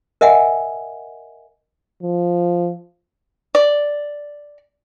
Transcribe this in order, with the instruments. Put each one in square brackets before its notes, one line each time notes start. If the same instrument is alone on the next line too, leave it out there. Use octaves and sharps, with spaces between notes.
[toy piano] A#4 D#5 E5 F#5 G#5
[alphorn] F3
[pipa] D5